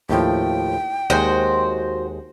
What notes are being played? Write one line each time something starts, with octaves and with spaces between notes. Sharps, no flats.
D#2 A2 F3 G5
D#2 G#3 F#4 C5